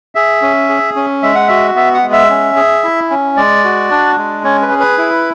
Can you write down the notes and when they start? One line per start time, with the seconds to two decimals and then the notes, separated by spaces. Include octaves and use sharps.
0.15 G#4 E5
0.42 C#4
0.69 G#4
0.96 C#4
1.23 G#3 E5
1.35 F#5
1.48 F#4 E5
1.76 B3 E5
1.94 F#5
2.03 G#3
2.12 E5
2.30 C#4
2.56 G#4
2.84 E4
3.10 C#4
3.37 G#3 D5
3.64 F#4
3.91 D4
4.18 G#3
4.44 C#4 C#5
4.62 B4
4.71 G#4
4.80 B4
4.98 E4